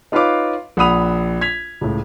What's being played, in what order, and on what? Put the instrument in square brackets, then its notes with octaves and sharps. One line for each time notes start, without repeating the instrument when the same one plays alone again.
[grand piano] D#4 F4 B4 C#5 F5 D6
A#1 F#5 B5 D#6 F7
G#6 B6 F7
C#2 A2